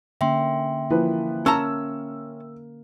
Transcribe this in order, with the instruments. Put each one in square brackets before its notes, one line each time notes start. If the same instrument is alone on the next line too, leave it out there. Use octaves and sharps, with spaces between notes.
[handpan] D3 A#3 C#4 [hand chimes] E5 G5 C6
[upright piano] E3 F3 B4 [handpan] A#3
[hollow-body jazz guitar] C#4 A5 A#5 [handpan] A#4 [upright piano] E6